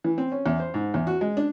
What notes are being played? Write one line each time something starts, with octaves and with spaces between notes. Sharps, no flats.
E3
C4
C#4
E2
C5
G#2
E2
F#4
G#3
D4